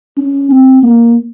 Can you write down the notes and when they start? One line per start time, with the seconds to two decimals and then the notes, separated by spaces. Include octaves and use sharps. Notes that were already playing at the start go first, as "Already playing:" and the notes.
0.17 C#4
0.51 C4
0.83 A#3